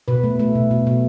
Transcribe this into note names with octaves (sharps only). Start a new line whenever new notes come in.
B2 B4
A3
A3
B2
B2
B2